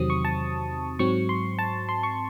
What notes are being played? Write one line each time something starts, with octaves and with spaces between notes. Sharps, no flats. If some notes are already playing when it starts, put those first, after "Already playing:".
Already playing: E2 C3 D#3 F#3 C4 D#6
C#6
A5
G#2 F#3 C4 C#6
C6
A5
C6
C#6